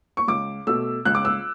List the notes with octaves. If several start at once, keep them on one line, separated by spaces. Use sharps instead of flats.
C#6
C#2 D6
B2 A3 E6
C#2 F#6
D6
E6